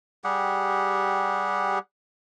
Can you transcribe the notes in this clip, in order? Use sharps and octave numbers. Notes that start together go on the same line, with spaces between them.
G3 G4 G#4 F#5